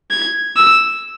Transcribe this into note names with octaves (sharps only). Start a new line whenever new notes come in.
G#6
E6